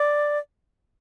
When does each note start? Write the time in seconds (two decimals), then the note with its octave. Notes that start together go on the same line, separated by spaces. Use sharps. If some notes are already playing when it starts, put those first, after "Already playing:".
Already playing: D5